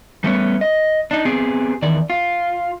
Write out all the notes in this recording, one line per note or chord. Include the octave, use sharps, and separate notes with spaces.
G3 A3 B3 C#4 C5 C#5
D#5
D4 D#4
B3 C4 G4 G#4
E2 D#3 D5
F4